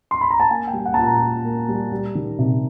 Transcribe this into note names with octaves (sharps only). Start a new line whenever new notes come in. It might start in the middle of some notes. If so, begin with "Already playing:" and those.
C6
B5
A#5
A5
A#3 G#5
G5
G3
F#5
A#2 A5
A#5
A#2
A#3
G3
G3
D#3
C3